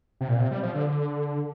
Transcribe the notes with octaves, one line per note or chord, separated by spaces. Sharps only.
C3
A#2
C3
G3
F3
D3